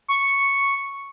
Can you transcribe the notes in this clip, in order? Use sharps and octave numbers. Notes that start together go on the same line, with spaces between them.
C#6